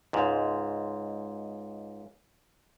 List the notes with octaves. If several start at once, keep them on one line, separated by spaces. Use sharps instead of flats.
C#2 G#2